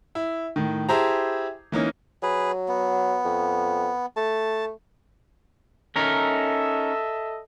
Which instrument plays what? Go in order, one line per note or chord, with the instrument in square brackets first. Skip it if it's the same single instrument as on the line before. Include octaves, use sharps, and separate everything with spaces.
[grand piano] E4
A2 D#3
E4 G4 G#4 C5 A5 A#5
E3 A#3 C#4 D#4
[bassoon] F#3 [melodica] G#4 B4
[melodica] B3
[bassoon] F2
[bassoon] A3 [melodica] A5
[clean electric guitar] C#4 D#4 A#4 [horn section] A4 D#5 E5